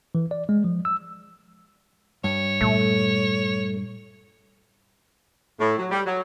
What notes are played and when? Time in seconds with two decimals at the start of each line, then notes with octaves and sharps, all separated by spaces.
0.15 E3
0.31 D5
0.49 G#3
0.64 F3
0.85 E6
2.24 G2 C#5
2.61 A#2 G3 A3
5.60 A2
5.79 F#3
5.92 G3
6.06 F#3